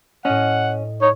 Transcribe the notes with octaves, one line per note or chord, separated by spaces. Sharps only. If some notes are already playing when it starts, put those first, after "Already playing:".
A2 C#4 D#5 F#5
D#4 C#5